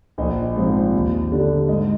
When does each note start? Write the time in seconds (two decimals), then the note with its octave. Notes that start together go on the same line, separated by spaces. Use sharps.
0.18 A#1 D#5
0.56 G#2 F3 C4
0.93 D#2
1.32 D3 G3 D4
1.69 G#2 D#5